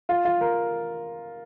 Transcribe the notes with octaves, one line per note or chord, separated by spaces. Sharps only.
F4
F4
A#4